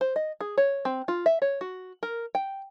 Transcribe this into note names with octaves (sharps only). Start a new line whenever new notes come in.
C5
D#5
G#4
C#5
C4
F4
E5
C#5
F#4
A#4
G5